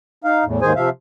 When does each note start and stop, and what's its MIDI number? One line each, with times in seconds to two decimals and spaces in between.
0.24 0.44 63
0.24 0.44 77
0.45 0.60 40
0.45 0.60 45
0.62 0.73 39
0.62 0.73 44
0.62 0.73 51
0.62 0.73 68
0.62 0.73 72
0.62 0.73 80
0.76 0.89 48
0.76 0.89 53
0.76 0.89 76
0.76 0.89 77